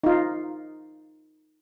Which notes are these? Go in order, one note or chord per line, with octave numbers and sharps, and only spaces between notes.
D#4 F4